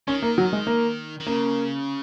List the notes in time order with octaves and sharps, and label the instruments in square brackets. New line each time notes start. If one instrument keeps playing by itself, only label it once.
[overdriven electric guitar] D#3 [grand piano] C#4
[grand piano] A#3
F#3
G#3
A#3
[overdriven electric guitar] D#3
[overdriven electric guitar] C#3 [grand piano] A#3